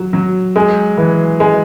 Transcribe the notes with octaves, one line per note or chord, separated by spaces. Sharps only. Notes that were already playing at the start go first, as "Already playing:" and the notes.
Already playing: F#3
F#3
G#3
E3
G#3